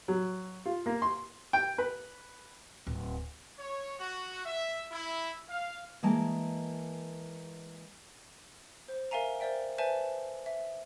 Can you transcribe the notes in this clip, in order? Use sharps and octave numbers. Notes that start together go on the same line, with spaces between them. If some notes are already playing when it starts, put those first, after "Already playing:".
F#3
F4
A#3
C6
G5
B4
D1
C#5
F#4
E5
E4
F5
E3 G#3 A#3 A5
C5
A#4 E5 F5 G#5 A#5
A#4 C5 D5 E5 G5
B4 C5 D5 E5 G#5 A5
E5